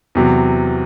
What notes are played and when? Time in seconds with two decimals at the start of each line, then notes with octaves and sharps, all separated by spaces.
0.15 E2 C3 F#3